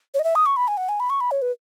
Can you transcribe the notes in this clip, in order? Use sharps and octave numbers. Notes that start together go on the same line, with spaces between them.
C#5
D#5
E5
D#6
C#6
B5
G#5
F#5
G#5
B5
C#6
B5
C#5
B4